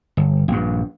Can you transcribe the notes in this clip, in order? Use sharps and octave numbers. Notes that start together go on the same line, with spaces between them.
G1
A#1 G2